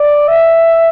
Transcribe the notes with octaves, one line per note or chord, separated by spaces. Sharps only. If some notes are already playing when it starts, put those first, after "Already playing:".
Already playing: D5
E5